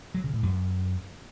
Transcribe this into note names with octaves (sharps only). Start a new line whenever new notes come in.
F#3
C#3
A2
F#2